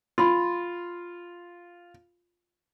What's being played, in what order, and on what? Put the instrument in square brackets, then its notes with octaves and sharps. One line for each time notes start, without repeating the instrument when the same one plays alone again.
[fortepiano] F4 [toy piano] B5 C6